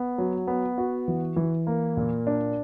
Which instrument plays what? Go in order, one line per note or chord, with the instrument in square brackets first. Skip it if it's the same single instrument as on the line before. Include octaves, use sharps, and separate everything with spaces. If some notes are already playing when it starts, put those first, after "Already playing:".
Already playing: [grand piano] B3
F#3
B3
F#4
E3
E3
A#3
A#2
D4